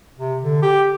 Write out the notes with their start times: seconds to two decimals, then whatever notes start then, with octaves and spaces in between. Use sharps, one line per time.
0.17 C3
0.42 D3
0.62 G4